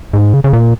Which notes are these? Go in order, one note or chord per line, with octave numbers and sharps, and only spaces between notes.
G#2
C#3
C#3
A#2